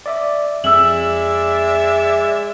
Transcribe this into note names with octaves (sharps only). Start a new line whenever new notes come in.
D5 E5 D6
F2 G#3 D5 E5 E6 F#7